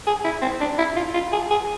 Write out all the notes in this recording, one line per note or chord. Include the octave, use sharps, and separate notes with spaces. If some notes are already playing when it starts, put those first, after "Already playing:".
G#4
E4
C4
D4
E4
F4
F4
G#4
G#4